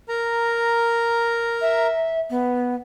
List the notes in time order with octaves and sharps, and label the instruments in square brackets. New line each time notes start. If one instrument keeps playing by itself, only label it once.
[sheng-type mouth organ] A#4 A#5
[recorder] E5
B3